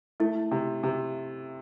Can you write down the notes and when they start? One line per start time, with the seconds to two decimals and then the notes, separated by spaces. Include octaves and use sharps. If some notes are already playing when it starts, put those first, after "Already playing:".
0.20 A3 E4
0.51 C3
0.83 C3